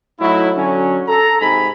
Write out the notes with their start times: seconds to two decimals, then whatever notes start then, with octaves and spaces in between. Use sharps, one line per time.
0.20 A2 F#3 A3 D#4 E4
0.57 D3 F#3 C#4
1.08 A4 A#5
1.41 G#2 C3 G#5 B5